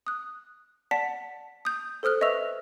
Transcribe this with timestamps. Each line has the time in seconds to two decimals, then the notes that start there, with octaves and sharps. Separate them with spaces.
0.07 D#6 F#6
0.91 D5 F#5 A5 B6
1.65 D#6 G6
2.03 A4 C5 D#6 F6 F#6
2.21 B4 D#5 E5 C#6 E6 F7